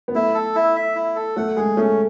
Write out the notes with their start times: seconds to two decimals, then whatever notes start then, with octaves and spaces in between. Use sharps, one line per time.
0.08 B3
0.15 A3 E4
0.35 A4
0.55 E4
0.76 E5
0.96 E4
1.16 A4
1.37 A3 F#5
1.57 G#3 G#4
1.77 A3 C#4